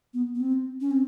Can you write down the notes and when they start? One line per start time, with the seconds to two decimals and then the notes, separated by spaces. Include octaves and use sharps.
0.14 B3
0.35 B3
0.40 C4
0.81 C#4
0.91 C4